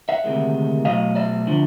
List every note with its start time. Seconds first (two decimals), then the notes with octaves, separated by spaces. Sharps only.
0.09 E5 F#5
0.24 D2 C3 D#3 G#3
0.85 B1 B2 F#3 A3 D#5 F5
1.15 D5 E5
1.47 D3 F3